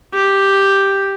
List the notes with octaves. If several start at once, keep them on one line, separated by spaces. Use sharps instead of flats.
G4